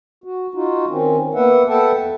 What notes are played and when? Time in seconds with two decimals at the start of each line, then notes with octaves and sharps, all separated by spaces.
0.24 F#4
0.54 D#4 F4 F#4
0.89 D#3 C4 C#4
1.34 A#3 B3 B4 E5 F#5
1.68 A4 B4 E5 F#5 G5 A5
1.98 E2